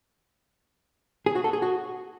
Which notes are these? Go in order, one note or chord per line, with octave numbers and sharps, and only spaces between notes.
G#4
F#4
A4
G#4
F#4